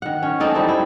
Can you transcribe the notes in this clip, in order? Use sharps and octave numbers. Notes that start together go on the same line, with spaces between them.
D#3 F#5
C#4
C4 D#4 A4 D5
G3 C4 E4
E4